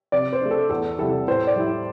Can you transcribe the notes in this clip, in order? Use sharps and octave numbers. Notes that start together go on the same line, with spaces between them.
C3 D5
C5
A3 D4
A4
E2 A4
C3 G3 E4 A4
A2 C5
D5
G3 E4